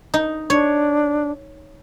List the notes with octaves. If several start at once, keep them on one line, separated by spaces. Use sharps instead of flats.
D#4
D4 C#5